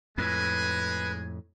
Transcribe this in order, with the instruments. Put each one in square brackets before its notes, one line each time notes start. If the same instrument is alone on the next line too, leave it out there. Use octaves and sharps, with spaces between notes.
[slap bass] F2 A2 [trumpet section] G#3 G#5 [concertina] B4